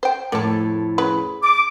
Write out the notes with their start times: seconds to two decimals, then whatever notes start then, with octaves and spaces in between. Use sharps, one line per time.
0.03 C5 G5
0.32 F2 A2 A#3 A4
0.98 C#3 B4
1.43 D6